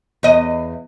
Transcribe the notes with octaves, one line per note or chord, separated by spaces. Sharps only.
E2 D#5